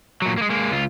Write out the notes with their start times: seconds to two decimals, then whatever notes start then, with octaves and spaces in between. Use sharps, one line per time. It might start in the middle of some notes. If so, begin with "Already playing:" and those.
0.22 A#2 F#3
0.38 G#3 A#3
0.50 G#3 A#3
0.71 C#2 F4